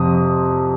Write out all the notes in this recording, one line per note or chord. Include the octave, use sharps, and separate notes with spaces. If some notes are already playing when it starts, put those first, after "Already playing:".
Already playing: F2 C3 D#6